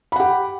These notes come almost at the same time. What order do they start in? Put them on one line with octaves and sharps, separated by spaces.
B5 F#5 G4